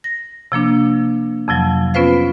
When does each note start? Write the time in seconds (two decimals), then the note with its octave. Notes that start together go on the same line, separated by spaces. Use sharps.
0.04 A#6
0.52 C3 F3 A#3 D4
1.48 F2 C3 F3 F#3
1.94 B3 C#4 F4 B4 C5 F5